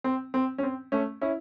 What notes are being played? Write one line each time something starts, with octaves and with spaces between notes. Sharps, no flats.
C4
C4
C#4
C4
A3 C#4
C#4 E4